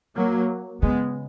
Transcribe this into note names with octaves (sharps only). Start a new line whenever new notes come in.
F#3 A#3
C#3 G#3 B3